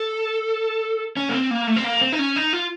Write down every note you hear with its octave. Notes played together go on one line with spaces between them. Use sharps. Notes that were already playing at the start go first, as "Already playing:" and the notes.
Already playing: A4
C#4
A#3
C4
A#3
A3
C4
A#3
C4
D#4
C#4
D#4
F4